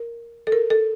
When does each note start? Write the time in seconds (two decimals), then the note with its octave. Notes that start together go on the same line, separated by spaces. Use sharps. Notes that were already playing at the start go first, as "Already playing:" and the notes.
Already playing: A#4
0.47 A4
0.52 A#4
0.70 A4